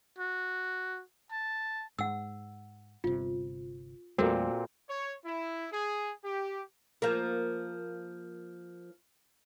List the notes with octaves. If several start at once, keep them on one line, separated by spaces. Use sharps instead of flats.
F#4
A5
G#2 F#5 E6
G1 C3 F4
E2 A#2 G3 A3 C4 F#4 A4 A#4
C#5
E4
G#4
G4
F3 A#3